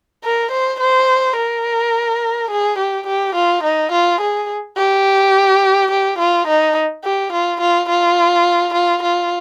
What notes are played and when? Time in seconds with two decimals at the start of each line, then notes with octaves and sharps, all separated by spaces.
0.24 A#4
0.51 C5
0.80 C5
1.37 A#4
2.50 G#4
2.78 G4
3.07 G4
3.35 F4
3.64 D#4
3.92 F4
4.21 G#4
4.77 G4
5.91 G4
6.19 F4
6.47 D#4
7.04 G4
7.32 F4
7.61 F4
7.89 F4
8.74 F4
9.03 F4